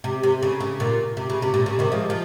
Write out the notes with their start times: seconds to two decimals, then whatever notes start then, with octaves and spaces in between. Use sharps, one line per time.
0.04 C3
0.23 C3
0.43 C#3
0.60 C#3
0.80 A#2
1.17 C3
1.30 C#3
1.42 C3
1.54 A#2
1.66 C#3
1.79 C3 D#3
1.92 F3 G#3
2.10 F3